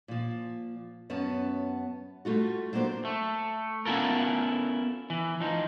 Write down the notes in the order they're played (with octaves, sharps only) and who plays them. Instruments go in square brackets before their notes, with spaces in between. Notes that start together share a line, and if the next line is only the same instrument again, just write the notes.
[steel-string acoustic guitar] A#2 F3
F#2 B3 C#4 A5
G3 A3 F4 F#4
F#3 A#3 B3 D4 C5
[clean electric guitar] A3
B3 C#4 E4 F4 A4 A#4
E3
F3 D#4